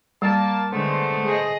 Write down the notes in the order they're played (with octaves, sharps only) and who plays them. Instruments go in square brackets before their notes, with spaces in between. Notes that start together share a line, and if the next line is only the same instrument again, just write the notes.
[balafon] G3 [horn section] A#3 A5
[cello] D3 G#3 [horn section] A3 B3 C5
[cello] G#4 D#5